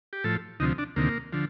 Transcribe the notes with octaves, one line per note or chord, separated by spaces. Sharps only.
G4
A2 F3 A4
D2 C3 F3 D#4
D4
D2 C3 D#3 A#3
D3 F3